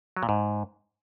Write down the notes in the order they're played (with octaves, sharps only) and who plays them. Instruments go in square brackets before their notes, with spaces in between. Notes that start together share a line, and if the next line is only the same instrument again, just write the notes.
[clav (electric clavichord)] F#3
A#2
G#2